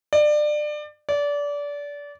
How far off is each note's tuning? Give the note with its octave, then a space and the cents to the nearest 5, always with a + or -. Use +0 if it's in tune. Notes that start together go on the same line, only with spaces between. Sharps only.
D5 +25
D5 -25